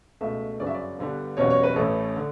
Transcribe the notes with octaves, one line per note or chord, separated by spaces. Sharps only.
C#2 B2 A3 E5
G1 F#2 C#3 F#3 C#4 D5
E5
D5
G1 G2 D3 G3 B3
F#1 E2 B2 G3 C#4 C#5
C#5
B4
A1 A2 E3 A3 C#4 A4
D3